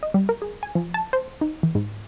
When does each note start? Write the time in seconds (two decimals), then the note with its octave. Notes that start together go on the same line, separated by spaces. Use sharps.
0.03 D#5
0.14 G3
0.29 A#4
0.42 G#4
0.63 G#5
0.75 F3
0.94 A5
1.13 C5
1.41 D#4
1.63 E3
1.75 G#2